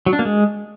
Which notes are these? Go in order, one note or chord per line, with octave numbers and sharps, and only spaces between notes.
F#3
D4
A#3
G#3